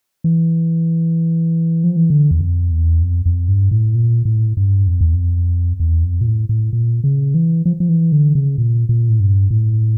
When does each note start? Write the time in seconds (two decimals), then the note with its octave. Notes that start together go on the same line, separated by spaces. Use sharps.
0.24 E3
1.84 F3
1.97 E3
2.10 D3
2.31 E2
2.41 F2
2.71 E2
3.02 F2
3.26 F2
3.48 G2
3.71 A2
3.95 A#2
4.25 A2
4.57 G2
4.87 F2
5.01 E2
5.14 F2
5.80 E2
6.03 F2
6.21 A#2
6.27 A2
6.49 A2
6.73 A#2
7.04 C#3
7.34 E3
7.65 F3
7.80 F3
7.89 E3
8.12 D3
8.35 C#3
8.58 A#2
8.89 A#2
9.09 A2
9.20 G2
9.51 A2